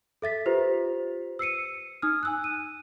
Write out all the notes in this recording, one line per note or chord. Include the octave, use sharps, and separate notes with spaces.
A4 E5 A6 B6
F4 G4 B4 C5
E6 C7 C#7 D#7
D#4 D#6 F6
G#5 E6 F#6
D#7